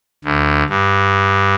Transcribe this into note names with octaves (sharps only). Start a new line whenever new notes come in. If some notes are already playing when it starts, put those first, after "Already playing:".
D2
G2